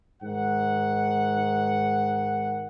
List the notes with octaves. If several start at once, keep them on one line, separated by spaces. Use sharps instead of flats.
G#2 D#3 F#5